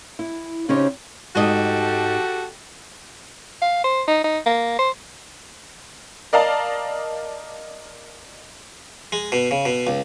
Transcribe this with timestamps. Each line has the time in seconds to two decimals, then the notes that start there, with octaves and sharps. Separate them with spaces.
0.19 E4
0.69 C#3 C#4 D#4 G4 C5 C#5
1.35 G#2 F#4 G4 A4 D#5
3.62 F5
3.84 C5
4.08 D#4
4.24 D#4
4.46 A#3
4.79 C5
6.33 A#4 D5 D#5 F5 A5 A#5
9.12 G#3
9.32 B2
9.51 C#3
9.66 B2
9.87 C#2